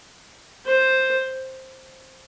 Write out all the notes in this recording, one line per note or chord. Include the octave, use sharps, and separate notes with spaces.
C5